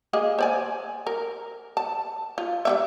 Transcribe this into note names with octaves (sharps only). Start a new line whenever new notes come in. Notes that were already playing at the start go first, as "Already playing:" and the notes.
A#3 G#4 D#5
C5 D5 G#5
A#4
A5
F4
G3 D4 E5